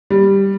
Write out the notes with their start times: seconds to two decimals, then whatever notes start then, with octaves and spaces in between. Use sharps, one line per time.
0.10 G3